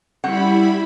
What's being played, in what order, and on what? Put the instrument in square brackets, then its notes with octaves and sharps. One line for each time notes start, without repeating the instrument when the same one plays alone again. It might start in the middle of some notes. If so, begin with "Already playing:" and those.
[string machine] G3 E4 B5 [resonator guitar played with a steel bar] C4 C#4 F#5